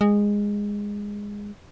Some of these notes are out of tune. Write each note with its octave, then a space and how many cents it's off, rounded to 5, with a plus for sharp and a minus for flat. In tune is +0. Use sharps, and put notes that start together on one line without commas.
G#3 -15